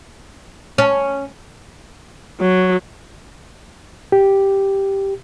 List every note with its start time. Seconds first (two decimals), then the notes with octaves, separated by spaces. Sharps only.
0.78 C#4
2.40 F#3
4.12 G4